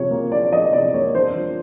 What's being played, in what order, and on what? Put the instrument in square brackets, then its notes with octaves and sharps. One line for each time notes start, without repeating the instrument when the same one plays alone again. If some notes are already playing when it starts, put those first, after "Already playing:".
Already playing: [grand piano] C3 F3 [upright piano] C#5
[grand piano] A#3
[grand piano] D4 [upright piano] D5
[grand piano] F3 [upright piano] D#5
[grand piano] C3 [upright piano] D5
[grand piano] A#3 [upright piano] C#5
[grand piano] D4 [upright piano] C5
[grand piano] F3